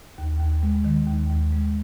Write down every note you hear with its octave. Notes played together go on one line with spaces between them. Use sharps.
D#2
D#2
G#3
D#3
D#2
D#2
G#3